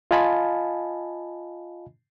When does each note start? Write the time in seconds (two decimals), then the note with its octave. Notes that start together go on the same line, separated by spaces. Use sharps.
0.11 F4 D#5 F5 G#5 A5 B5